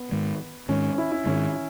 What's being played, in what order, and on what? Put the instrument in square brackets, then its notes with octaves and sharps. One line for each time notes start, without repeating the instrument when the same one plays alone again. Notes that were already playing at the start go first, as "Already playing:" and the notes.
Already playing: [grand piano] B3
[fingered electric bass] G#2 D#3 G#3
[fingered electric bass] G#2 D#3 G#3 [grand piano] C#4
[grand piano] E4
E4
[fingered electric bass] G#2 D#3 G#3 [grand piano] C#4